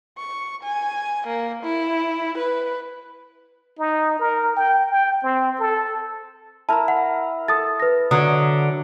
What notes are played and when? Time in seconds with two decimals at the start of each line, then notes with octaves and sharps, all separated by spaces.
0.18 C#6
0.64 G#5
1.27 A#3
1.63 E4
2.38 B4
3.79 D#4
4.19 A#4
4.56 G5
4.90 G5
5.23 C4
5.60 A4
6.69 E4 A#4 A5 A#5
6.88 F#5
7.48 A4 D#6 A6
7.80 B4 A#6
8.11 D3 F#3 C#5 D#6